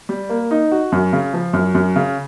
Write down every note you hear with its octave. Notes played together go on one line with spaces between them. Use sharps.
G3
A#3
D#4
F#4
F#2
C#3
F3
F#2
F#2
C#3